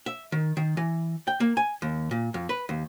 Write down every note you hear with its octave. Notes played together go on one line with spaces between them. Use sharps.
E5
D#3
D#3
E3
G5
A#3
G#5
D#2
A#2
F2
B4
D#2